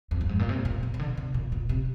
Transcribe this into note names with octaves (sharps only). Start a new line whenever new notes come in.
F2
G2
G#2
A#2
C3
A#2
C3
C3
D3
C3
A#2
A#2
C3